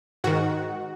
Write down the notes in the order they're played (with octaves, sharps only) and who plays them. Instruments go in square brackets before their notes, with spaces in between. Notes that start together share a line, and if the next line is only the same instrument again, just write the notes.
[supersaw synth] G#2 D#3 F#4